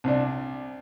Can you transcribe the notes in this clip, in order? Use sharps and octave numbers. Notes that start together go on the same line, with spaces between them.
C2 D4